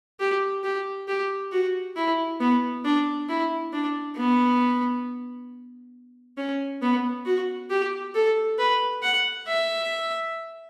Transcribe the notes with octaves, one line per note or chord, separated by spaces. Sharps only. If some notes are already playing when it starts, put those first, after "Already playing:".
G4
G4
G4
F#4
E4
B3
D4
E4
D4
B3
C#4
B3
F#4
G4
A4
B4
F#5
E5